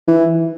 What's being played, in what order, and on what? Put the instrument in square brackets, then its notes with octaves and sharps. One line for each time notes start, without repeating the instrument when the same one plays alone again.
[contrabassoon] E3